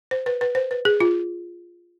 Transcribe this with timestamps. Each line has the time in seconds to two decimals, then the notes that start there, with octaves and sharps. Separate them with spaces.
0.11 C5
0.26 B4
0.41 B4
0.55 C5
0.71 B4
0.85 G#4
1.00 F4